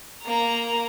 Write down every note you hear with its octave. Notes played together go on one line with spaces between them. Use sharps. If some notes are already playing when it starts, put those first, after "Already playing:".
A#3 A#5